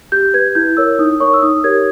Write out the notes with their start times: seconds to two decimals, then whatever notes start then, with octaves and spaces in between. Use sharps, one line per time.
0.12 G4 G6
0.34 B4 G#6
0.55 E4 G6
0.77 A#4 C#5 E6
0.99 D#4 D#6
1.20 A#4 C#5 C#6
1.34 E6
1.42 D#4 D#6
1.64 G4 A#4 C#5 G#6